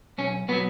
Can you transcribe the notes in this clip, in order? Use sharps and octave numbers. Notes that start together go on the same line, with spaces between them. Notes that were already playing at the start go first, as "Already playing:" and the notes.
B1 C#4
B2 F#3 B3